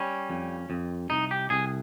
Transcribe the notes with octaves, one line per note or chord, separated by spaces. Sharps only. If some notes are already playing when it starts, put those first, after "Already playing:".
Already playing: G3 C#4
F2
F2
C2 D#4
G4
C2 G#4